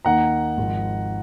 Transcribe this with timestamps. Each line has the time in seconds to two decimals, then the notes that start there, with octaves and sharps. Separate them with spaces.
0.05 D#2 D#3 A#3 D#4 A#4 F#5 A#5
0.57 G#1 G#2 F3